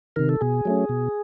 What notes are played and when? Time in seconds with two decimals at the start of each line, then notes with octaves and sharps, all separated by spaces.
0.16 C3 D#3 A#4
0.29 A4
0.41 B2 G#4
0.65 F#3 A3 C#4
0.89 B2